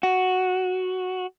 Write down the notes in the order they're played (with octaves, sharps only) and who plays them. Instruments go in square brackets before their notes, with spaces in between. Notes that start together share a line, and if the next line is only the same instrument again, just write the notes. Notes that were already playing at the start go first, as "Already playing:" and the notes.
[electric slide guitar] F#4